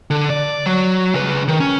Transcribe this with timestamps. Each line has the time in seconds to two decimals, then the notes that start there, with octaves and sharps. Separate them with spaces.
0.10 D3
0.30 D5
0.66 F#3
1.14 C#3 B4
1.48 D#3
1.60 C#4